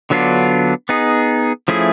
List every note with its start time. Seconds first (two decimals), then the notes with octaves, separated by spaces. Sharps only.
0.10 D3 F#3 B3 D4 F4
0.89 B3 D#4 G#4
1.68 F3 A3 C#4 E4 G#4